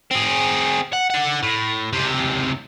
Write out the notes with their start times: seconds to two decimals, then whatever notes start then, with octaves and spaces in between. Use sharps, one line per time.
0.11 C4 G#4
0.93 F#5
1.10 D4 F#5
1.43 A2
1.93 C#2 C3